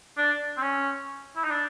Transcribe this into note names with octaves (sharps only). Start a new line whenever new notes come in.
D4
C4
C#4
E4
D#4
D4